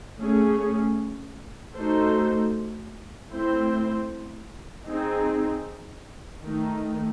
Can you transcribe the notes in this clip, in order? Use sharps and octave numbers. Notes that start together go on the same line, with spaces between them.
A3 C#4 G#4
A3 D#4 F#4 A4 C5
A3 C4 E4 C5
C4 D#4 G#4
D#3 A3 D#4